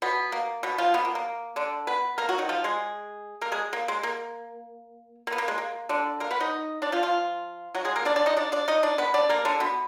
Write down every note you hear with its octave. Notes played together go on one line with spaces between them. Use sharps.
B2 B3
A#3
B2 B3
F3 F4
B2 B3
A#3
A#3
D3 D4
B3 B4
A#3 A#4
F#3 F#4
D#3 D#4
F3 F4
G#3 G#4
A#3 A#4
G#3 G#4
A#3
G#3
A#3
A#3
B3
A#3
G#3
A#3
D3 D4
A#3 A#4
B3 B4
D#4 D#5
D4 D5
F3 F4
F3 F4
F#3 F#4
G#3 G#4
A#3 A#4
D4 D5
D4 D5
D#4 D#5
D4 D5
D4 D5
D#4 D#5
D4 D5
B3 B4
D4 D5
A#3 A#4
D3 D4
B2 B3